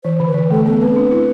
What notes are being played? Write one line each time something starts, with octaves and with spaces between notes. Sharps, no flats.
E3 C5
D3
B4
E3
A3 A4
B3 A4
C4 B4
D4
E4